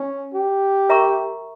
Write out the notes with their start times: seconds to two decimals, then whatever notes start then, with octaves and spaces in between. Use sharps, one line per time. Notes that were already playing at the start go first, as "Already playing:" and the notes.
Already playing: C#4
0.34 G4
0.89 A#4 E5 A#5 C#6